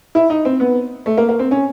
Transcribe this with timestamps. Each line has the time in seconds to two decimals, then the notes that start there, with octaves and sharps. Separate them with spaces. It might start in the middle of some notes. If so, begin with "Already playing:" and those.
0.15 E4
0.30 D#4
0.45 C4
0.60 B3
1.06 A3
1.17 A#3
1.29 A#3
1.39 C4
1.51 C#4